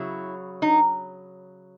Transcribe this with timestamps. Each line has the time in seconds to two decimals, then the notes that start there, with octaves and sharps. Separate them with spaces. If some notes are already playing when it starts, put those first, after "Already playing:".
Already playing: C#3 F#3 E4
0.62 D#4